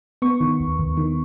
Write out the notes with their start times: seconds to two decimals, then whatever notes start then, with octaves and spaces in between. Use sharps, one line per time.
0.22 B3 C#6
0.41 D#3
0.60 D#2
0.79 D#2
0.97 D#3